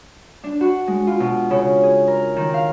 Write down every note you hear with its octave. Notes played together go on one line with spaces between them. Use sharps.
D4
F#4
G#3
F4
B2
C#3
G#4
A#4
D#3
F5